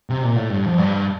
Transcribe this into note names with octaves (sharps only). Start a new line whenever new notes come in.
C3
A#2
A2
G2
F2
G2